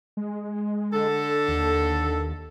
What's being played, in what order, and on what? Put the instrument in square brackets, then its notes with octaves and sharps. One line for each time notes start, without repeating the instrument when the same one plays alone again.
[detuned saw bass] G#3
[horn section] D3 A4
[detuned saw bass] D#2